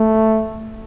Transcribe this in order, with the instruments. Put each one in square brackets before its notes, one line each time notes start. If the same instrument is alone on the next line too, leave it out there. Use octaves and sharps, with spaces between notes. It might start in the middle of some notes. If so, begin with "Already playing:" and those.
Already playing: [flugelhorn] A3